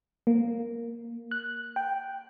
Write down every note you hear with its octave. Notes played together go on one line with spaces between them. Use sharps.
A#3
F#6
G5